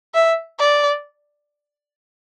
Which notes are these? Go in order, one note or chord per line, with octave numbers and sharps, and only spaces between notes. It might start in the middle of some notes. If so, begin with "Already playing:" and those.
E5
D5